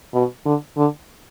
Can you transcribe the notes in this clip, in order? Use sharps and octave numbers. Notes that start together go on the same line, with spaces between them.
B2
D3
D3